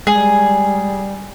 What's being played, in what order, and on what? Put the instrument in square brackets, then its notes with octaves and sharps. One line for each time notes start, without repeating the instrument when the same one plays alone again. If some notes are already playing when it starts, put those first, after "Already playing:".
[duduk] G3 [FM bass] G#3 [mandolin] G#4